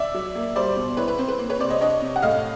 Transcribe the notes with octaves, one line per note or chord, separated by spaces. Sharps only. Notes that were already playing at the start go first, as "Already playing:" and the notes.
Already playing: D5 E5
F#3
A#3
G3 C5 D5
B2
E4 B4 C#5
B4
C4 C5
B4
A#3
B4 C#5
C3 C5 D5
C#5 D#5
D4 C#5 D#5
C3
F#5
A2 D#5 F5